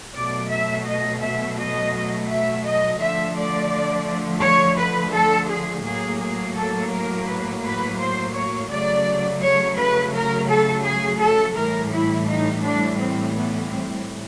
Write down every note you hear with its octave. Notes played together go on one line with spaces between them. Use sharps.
B2 F#3 A3 D5
E5
D#5
E5
D#5
E5
D#5
D3 F3 A3 E5
D5
C#5
B4
A4
G#4
A2 F#3 A#3 G#4
G#4
A4
A#4
B4
B4
C5
C#5
C#3 F#3 A3 D5
C#5
B4
A#4
A4
G#4
A4
A2 E3 G3 A#4
E4
D#4
D4
C4
B3
C4